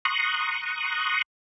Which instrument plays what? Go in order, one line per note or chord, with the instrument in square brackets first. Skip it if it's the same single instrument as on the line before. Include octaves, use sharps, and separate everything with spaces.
[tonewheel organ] A#5 C6 C#6 D#6 F#6